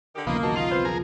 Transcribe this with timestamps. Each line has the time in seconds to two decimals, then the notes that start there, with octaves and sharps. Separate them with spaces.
0.15 D3 D#3 G4
0.27 B1 E2 C#3 F3 A#3 B3 D#4
0.43 D#3 F#4 A#4 A5
0.56 F4 F7
0.71 C4 B4 C5
0.85 F3 G#4 A#4